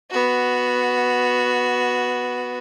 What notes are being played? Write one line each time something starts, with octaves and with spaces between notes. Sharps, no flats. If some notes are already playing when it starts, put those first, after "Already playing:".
B3 F#4